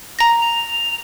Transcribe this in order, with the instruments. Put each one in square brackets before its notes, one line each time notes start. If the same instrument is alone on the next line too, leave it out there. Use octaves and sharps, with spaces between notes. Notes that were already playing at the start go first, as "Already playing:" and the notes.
[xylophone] A#5 A#6
[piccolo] F7